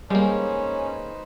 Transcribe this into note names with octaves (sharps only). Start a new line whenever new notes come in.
G3 G#3 A#3 C#4 D#4 B4 C5